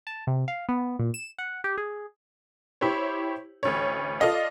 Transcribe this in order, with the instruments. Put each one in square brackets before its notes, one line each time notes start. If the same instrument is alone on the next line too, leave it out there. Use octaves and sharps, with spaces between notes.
[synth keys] A5
C3
F5
B3
A#2
E7
F#5
G4
G#4
[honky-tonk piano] E4 G4 C5 C#5
A1 D2 C#5
F4 A4 D5 D#5 F5